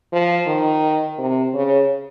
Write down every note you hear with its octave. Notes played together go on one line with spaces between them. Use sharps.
F3
D#3
C3
C#3